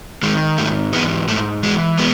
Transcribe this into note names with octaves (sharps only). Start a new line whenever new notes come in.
D#3 G#3
G#2 A3
E3 G#3 B3
G#2 A3
E3 G#3
G#3 B3